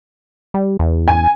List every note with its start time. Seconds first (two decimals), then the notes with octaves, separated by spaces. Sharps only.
0.54 G3
0.79 E2
1.08 G#5